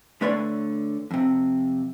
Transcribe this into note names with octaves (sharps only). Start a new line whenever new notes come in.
D3 A3 B4 C#5 D5 C6
F2 C3